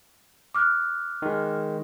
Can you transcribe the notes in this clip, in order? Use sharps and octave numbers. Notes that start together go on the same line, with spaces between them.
D6 F6 F#6
D#3 G#3